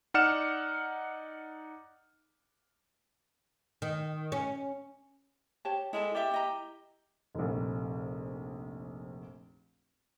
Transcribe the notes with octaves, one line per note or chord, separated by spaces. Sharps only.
D#4 D5 F#5 F6 C#7 E7
D#3
C#4
G4 C#5 A5
G#3 E4 A4 A5
G4 D5 E5
E4 D#5 A#5
F1 A#1